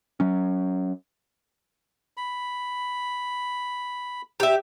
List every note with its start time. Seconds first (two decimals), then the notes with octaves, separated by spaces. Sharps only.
0.20 F#3 C#4
2.17 B5
4.40 G4 E5